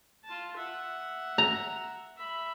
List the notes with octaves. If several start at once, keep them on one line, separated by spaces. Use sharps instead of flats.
F4 A5
E5 F#5
A#5
E5 B5